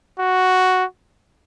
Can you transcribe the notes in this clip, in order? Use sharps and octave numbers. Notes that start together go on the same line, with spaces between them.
F#4